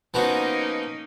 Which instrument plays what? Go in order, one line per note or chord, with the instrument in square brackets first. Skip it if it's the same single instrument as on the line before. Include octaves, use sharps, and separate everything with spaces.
[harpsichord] F3 B3 F#4 [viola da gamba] A#3 C#4 D#4